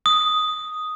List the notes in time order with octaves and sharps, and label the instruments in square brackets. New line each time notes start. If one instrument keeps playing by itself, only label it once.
[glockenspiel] D#6